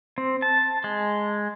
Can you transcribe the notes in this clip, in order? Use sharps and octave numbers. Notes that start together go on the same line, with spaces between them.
C4
A5
G#3